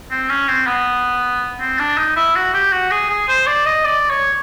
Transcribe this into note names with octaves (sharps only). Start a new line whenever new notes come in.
C4
C#4
C4
B3
C4
D4
D#4
E4
F#4
G4
F#4
G#4
G#4
C5
D5
D#5
D5
C#5